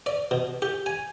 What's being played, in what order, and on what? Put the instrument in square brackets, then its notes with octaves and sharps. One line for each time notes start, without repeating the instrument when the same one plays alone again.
[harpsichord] D5
B2
G4
G#5